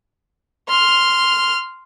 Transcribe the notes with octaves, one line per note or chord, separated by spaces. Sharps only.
C6 F6